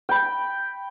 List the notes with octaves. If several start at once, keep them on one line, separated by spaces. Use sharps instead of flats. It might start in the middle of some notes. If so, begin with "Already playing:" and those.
G5 B5